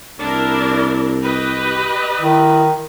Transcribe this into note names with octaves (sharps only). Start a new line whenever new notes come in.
C2 D4 E4 A#4
G4 B4 D#5
D#3 E4